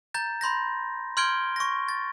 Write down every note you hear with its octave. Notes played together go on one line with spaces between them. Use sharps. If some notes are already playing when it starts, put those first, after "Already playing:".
A#5 G6 A6
B5 C6 G6 A#6
C6 F6 G6 G#6 D7 G7
C#6 A#6
A6